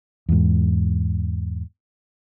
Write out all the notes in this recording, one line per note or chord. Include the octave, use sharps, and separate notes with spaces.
E2 G#2